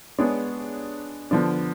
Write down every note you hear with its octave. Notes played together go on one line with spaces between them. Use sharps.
G#3 B3 D4 G#4 C#5
D3 F3 B3 D4